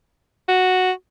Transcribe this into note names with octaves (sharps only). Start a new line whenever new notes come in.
F#4